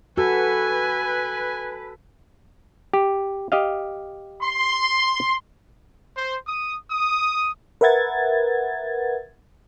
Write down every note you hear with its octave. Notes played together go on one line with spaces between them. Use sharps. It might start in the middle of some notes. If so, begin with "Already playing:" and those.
F#4 A4 B4 G#5
G4
G4 D#5 F5
C6
C5
D#6
D#6
A#4 B4 E5 F#5 G#6 A6